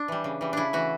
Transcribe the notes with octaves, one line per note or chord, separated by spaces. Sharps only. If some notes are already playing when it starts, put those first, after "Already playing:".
Already playing: D4
E3 G3
C#3
E3 G3
C#3 D4 E4
E3 A3 F#4